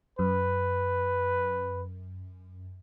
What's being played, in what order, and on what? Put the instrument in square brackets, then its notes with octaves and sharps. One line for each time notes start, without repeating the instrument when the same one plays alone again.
[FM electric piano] F#2 [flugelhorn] B4